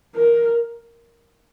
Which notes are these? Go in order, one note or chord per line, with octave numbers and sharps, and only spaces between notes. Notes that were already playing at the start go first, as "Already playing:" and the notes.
A#4